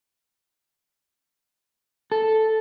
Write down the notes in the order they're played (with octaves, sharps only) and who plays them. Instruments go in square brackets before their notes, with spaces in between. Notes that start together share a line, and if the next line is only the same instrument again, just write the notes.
[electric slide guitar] A4